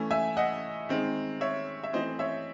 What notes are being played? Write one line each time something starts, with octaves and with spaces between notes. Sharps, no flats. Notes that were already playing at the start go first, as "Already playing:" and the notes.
Already playing: E3 A3 C#4 E4
E5 G#5
D#5 F#5
D#3 G#3 C4
C#5 E5
E5
E3 A3 C4 C5 D#5
C#5 E5